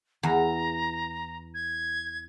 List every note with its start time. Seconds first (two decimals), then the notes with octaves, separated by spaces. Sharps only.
0.23 E2 A#5
1.54 G#6